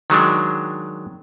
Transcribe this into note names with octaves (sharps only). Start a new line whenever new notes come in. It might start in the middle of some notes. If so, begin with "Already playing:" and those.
D#3 F#3 G#3 D4